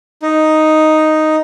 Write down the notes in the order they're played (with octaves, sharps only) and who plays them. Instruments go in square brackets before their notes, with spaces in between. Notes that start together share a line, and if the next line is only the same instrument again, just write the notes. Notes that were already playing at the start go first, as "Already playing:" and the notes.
[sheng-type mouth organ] D#4